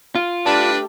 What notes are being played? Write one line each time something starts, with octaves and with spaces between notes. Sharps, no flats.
F4
G3 A3 D4 G4 B4 A5